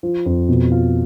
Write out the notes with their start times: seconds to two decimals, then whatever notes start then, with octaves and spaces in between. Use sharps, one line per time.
0.03 F3
0.26 F2
0.49 B2
0.72 F4